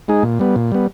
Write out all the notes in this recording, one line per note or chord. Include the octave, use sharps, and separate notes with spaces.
G#3 D#4 G#4
A#2
G3 B3
A#2
G3 B3